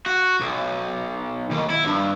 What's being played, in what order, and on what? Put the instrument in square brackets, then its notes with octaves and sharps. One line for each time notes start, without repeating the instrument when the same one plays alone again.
[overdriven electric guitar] F#4
B1
D#2
E4
D2 G2